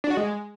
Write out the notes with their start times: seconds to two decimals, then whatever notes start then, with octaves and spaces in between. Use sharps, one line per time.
0.04 D4
0.10 F#4
0.17 G#3